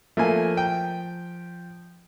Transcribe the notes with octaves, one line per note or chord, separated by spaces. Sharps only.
F3 A3 A#3 G#5
G5